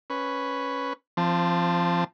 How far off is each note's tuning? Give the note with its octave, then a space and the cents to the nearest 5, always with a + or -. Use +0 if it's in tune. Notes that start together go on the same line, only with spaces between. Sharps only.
C#4 +0 B4 +0
F3 -20 C4 +10 A5 +0